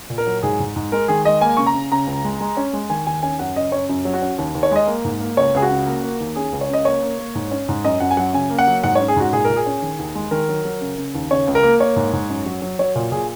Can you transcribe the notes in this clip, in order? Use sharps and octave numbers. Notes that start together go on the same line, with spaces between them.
A#2
A#4
F#3
G#2 G#4
G#2
G#2
G#3 A#4
D#3 G#4
G#3 D#5
A#3 G#5
C#3 C#6
A#5
C#3
C#3 A#5
C#2
G#3
G#3
C#4
G#3
D#3 G#5
D#2 G#5
C#4 G#5
F#2 F#5
C#3 D#5
C#4 C#5
F#2
F#3
F#4
C#4
D#2
D#2
C#5
G#3 D#5
A#3
G#2
A#3
C#2 C#5
C#2 G#4
F#4
C#3
A#3
A#3
D#2
C#4 G#4
C#2
C#5
C#3 D#5
A#3 C#5
A#3
A#3
G#2
C#4
G#2
F#2 D#5
F#2 F#5
G#5
F#3 F#5
C#3 G#5
A#3
F#5
F#3
G#2 F#5
C#5
C#4
G#4
G#2 F#4
A#2 G#4
A#2 A#4
G#4
C#4
D#3
D#2
G#3
D#3 A#4
F#3
F#3
C#3
C#3
D#2
C#3 C#5
C#2
A#4
A#3
A#3 C#5
G#2
G#2
F#2
F#3
F#3
F#3 C#5
A#2
A#2 G#4